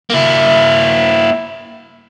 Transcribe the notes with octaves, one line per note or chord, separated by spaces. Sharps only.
A#3 E4